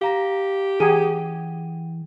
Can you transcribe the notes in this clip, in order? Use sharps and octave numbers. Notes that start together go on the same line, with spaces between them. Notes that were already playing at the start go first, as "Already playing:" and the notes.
G4 F5 A#5 A#6
E3 G#4 F#5 G5 D#7